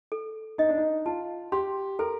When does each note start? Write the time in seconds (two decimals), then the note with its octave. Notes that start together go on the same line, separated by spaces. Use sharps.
0.12 A4
0.58 D#4 D#5
0.69 D4
0.78 D#4
1.06 F4 A5
1.52 G4 C6
1.99 A4 A#4